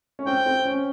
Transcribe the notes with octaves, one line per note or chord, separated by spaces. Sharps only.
C#4
C4 G5
C4
C#4